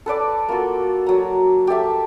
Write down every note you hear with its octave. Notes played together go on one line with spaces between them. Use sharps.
A4 B4 D5 A5
A#3 F4 F#4 A4
F#3 A#5
G4 A4 E5 A5